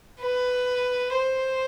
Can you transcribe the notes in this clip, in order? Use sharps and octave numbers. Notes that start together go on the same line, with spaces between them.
B4
C5